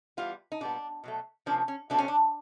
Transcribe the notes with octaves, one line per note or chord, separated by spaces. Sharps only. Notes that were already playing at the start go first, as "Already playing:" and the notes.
E3 G3 B3 F4
D#4
A#2 G3 B3 D4
B2 F#3 A3
C3 F3 A#3 C#4 D4
C#4
B2 F#3 A3 C4 D4
C#4
D4